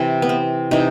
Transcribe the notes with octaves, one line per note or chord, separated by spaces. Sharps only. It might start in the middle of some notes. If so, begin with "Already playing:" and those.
Already playing: C3 E3 C4
B3
C4
C3 E3 D#4